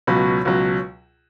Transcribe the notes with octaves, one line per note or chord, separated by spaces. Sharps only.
C#2 B2 F#3 B5
C#2 B2 F#3